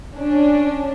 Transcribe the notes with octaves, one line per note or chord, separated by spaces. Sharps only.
C#4 D4